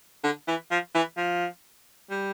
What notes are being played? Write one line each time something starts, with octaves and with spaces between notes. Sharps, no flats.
D3
E3
F3
E3
F3
G3